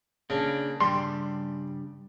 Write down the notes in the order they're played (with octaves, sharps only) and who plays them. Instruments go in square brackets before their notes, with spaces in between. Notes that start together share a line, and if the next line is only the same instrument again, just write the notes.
[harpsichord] C#3 [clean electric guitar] A#3 D4
[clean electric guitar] G2 C#3 [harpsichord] G3 [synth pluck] C6